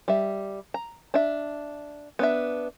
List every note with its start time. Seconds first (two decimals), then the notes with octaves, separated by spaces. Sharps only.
0.08 G3 E5
0.74 A#5
1.14 D4 E5
2.19 B3 D4 E5